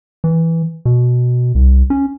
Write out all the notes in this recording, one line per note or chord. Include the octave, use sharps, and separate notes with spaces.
E3
B2
C2
C#4